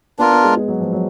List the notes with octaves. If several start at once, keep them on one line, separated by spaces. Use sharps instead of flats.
B3 D4 F4 A#4
B3
G#3
G#3
F#3
F3
F#3